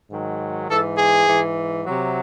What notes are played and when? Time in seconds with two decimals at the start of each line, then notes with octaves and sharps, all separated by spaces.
0.11 G#2 D#3 F#3
0.69 G#2 E3 A4
0.98 G#4
1.26 G#2 E3
1.84 C3 F#3